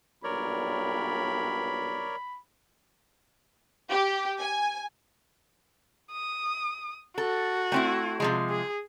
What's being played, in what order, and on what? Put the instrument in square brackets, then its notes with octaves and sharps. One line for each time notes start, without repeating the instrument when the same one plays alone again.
[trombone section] B1 G2 A#2 [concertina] A#4 C#5 D5 [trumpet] B5
[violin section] G4
G#5
[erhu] D#6
[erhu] F#4 [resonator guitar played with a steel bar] A4
[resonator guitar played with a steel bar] A3 C4 E4
C3 F3 G#3
[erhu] G#4